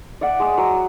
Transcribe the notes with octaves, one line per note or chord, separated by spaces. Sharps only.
D5 E5 F#5
G#3 D6 D#6
F#3